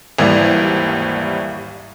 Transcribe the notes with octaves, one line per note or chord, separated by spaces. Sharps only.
G#1 D#2 E3 G3 E4 D5